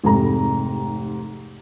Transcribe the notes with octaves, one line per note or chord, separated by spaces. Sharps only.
F1 G#2 C3 A4 A#5